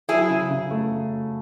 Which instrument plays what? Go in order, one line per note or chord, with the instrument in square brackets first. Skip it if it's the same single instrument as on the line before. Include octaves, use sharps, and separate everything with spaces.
[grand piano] F#3 [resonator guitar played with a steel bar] E4 G#4
[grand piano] C#3
C#3
A3